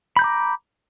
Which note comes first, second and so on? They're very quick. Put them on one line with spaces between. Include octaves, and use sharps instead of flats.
B5 G6 A#5 D6